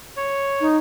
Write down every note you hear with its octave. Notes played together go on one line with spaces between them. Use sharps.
C#5
D#4